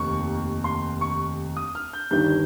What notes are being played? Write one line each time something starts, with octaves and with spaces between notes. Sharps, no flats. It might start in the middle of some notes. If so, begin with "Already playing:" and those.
Already playing: F1 D#2 C#6
C6
C#6
D#6
F6
G6
G1 G2 D#3 G3 G6